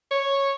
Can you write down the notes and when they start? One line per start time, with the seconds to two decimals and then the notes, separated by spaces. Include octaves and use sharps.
0.11 C#5